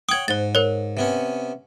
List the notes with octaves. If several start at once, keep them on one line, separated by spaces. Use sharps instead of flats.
C#5 F#5 G5 D#6 G#6
G#2 C5 A6
A#4 C#5
C3 B3 C#4